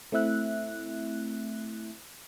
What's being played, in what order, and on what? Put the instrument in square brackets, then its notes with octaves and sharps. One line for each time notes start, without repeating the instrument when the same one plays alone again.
[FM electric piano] A3 C4 E4 E5 F#6